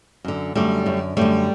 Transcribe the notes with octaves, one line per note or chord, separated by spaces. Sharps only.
F#2 D3
F#2 D3 G3 A3
F#2 D3
F#2 D3 G3 A3